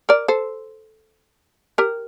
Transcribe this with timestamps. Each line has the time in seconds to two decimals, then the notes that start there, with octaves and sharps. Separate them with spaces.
0.09 A#4 D5
0.28 A4 C5
1.78 G4 A#4